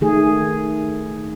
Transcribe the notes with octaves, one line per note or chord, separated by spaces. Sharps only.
D#3 A3 G#4